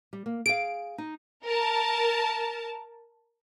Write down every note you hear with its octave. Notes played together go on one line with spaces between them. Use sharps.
G3
A#3
G#4 F5 D7
D#4
A#4 A5